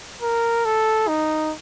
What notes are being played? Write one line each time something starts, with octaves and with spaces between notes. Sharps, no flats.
A#4
A4
D#4